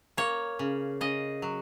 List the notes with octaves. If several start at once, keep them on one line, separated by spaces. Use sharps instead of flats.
A#3 C#5
C#3
C#3 D#5
F#3